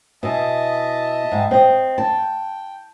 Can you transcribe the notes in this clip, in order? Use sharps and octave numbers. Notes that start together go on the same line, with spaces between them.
B2 E4 D#5 E5 G#5 A5
G#2 G3
C4 D#5
G5 A5